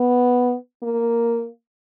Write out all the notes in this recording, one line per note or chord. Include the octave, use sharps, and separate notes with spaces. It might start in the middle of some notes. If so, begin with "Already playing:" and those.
Already playing: B3
A#3